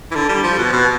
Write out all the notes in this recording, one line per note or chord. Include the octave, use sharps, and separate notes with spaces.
E3
D3
G3
F3
B2
B2